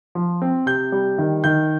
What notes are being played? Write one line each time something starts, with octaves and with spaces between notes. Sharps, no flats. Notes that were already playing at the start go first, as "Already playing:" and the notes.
F3
C4
C3 G6
G3
D#3
D#3 G6